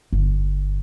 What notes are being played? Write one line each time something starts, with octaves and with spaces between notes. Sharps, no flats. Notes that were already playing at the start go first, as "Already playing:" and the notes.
G1